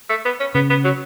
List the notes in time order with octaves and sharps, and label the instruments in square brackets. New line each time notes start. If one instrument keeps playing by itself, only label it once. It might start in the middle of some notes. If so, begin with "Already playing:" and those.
[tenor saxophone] A3
B3
C#4
[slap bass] C#3 [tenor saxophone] B3
[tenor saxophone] B3
F#3